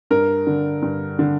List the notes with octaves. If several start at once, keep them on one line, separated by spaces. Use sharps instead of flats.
G2 A#4
D3
G2
D3